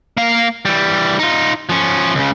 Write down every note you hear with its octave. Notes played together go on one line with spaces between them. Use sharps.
A#3 F5
E3 G3
D#4 F4
F3 C#4
C#2 C#3